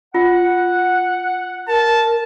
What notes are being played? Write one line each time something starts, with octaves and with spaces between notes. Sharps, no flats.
F4 F#5
A#4 A5